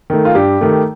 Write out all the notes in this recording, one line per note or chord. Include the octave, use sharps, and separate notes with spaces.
D#3 A3
F4
G2 G4
D#3 A3